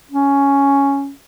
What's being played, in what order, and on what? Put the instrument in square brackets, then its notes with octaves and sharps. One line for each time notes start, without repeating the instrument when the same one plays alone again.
[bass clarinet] C#4